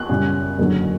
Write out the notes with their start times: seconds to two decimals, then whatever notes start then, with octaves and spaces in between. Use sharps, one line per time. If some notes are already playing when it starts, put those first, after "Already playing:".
Already playing: F#6
0.09 F#2 C#3 G3 C#4
0.59 F#1 E2 D3 F#3